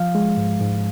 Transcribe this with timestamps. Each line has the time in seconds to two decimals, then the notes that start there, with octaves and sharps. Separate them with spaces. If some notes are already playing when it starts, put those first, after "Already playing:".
Already playing: F3 F5
0.15 G#3
0.37 G#2
0.61 G#2